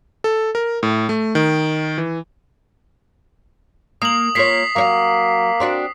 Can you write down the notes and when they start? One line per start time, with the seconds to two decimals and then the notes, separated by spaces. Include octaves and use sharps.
0.24 A4
0.55 A#4
0.83 A2
1.09 A3
1.35 D#3
1.98 E3
4.02 A#3 D#6 F#7
4.35 A#3 F4 C#5 B6 C7
4.76 F#3 A#3 C#5 F5
5.60 C4 D4 F#4